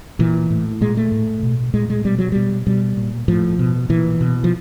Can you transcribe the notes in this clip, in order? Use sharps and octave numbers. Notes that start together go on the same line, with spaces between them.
A#2 E3
A2
A#2 G#3
A3
A2
B2
A#2 G#3
G#3
B2 G3
F#3
B2 G3
B2 G3
A#2
A2 F3
B2
A#2 E3
B2
F3